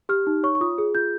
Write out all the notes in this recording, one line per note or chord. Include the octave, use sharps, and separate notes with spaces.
G4 F6
D#4
C#5 C#6
C#6
F4 D#6
G#4
F4 G6